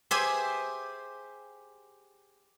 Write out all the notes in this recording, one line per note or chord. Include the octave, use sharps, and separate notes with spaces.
G4 G#4 C5 E5 G#5